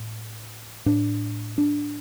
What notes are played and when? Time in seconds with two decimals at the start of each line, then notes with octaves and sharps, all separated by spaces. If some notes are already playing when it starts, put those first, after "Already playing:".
Already playing: A2
0.86 A2 D4
1.58 D4